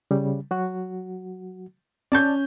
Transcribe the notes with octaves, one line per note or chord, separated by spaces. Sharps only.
C#3 G3
F#3 F#4
C#4 D5 A5 G6